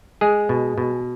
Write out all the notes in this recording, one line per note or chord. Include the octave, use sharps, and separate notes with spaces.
G#3 G#4
B2
B2